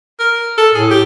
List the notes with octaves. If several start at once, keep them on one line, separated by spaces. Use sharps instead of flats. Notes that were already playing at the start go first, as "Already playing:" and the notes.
A#4
A4
A2 G#4
G4